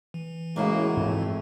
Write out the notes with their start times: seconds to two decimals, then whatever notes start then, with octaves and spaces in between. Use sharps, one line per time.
0.14 E3
0.56 A2 C#3 G#3 A#3 E4 F#4
0.97 F2 G#2 A3